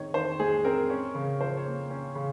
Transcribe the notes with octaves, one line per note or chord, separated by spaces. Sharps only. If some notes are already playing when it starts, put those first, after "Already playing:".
Already playing: D#3 G#3 C4 C#5 D#5
D#3 C5
G#3 G#4
C4 A#4
C#4
C#3
F3 C5
C#5
A#3
C#4
C#3